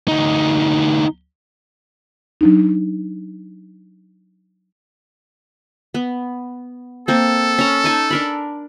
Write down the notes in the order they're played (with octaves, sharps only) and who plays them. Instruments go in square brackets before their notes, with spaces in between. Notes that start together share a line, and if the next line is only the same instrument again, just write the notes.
[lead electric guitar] D2 D#4
[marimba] F#3 D4 D#4
[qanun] B3
[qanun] A#3 C4 [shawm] A4
[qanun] C#4 A#5
D#4 G#5 A5
D4 A#4 B5